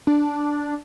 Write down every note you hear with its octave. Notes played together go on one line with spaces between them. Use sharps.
D4